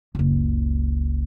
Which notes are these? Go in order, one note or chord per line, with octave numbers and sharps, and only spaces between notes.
F#1 C#2